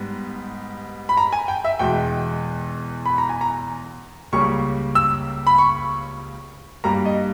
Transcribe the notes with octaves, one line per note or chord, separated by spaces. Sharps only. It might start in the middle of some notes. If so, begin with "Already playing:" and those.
Already playing: G#2 G3 B3
B5
A#5
G#5
G5
E5
E2 B2 G#3 G5
B5
A#5
G#5
A#5
C#2 C#3 G3 A#3 C#6
E6
B5
C#6
G2 G3 A#3 A#5
D#5